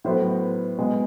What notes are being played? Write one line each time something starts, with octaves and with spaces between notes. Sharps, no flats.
A2 F#3 B3 C5
B2 G#3 B3